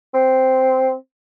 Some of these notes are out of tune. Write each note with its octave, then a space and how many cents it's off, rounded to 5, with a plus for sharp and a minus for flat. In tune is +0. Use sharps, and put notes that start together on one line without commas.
C4 -5